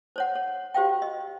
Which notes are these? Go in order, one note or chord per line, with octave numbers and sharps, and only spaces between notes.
C5 C#5 F#5
C#5
F#4 G4 C5 F5 G5
D#5